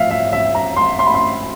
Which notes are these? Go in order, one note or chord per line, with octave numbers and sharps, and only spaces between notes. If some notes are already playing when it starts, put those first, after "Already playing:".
Already playing: F3 E5 F5
E5
E5
A#5
C6
C6
B5
C6